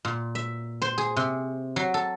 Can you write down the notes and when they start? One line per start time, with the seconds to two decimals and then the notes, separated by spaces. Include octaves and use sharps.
0.05 A#2
0.35 E5
0.82 C5
0.98 G#4
1.16 C3
1.76 F#3
1.94 A4